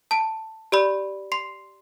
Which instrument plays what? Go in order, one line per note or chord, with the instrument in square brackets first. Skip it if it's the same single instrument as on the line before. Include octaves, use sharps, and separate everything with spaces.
[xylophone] A5 D7
G4 D5 B5
C6 C7